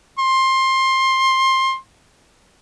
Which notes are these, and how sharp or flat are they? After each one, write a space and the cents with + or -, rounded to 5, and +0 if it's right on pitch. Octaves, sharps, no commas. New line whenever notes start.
C6 +20